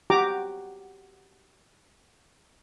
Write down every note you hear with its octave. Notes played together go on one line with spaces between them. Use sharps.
F#4 G4 G5 A#5 D6